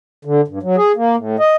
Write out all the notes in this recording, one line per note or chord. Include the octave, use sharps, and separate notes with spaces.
D3
G2
F#3
G#4
A#3
A2
D#5